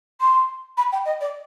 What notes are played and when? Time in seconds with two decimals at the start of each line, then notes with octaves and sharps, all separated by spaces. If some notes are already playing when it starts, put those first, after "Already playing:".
0.21 C6
0.77 B5
0.92 G5
1.05 D#5
1.21 D5